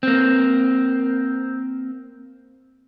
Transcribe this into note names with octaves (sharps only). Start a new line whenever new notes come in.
A#3 C4